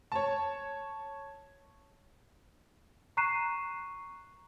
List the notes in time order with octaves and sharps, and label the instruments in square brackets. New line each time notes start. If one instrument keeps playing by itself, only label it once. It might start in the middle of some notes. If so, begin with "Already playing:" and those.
[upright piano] C#5 A5
[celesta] A#5 C#6 F#6 C7 D#7 E7